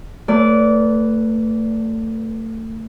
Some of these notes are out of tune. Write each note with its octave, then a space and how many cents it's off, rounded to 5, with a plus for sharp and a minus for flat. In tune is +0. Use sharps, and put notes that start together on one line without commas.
A3 +30 B4 +0 D5 -20